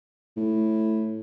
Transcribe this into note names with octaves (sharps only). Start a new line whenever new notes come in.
A2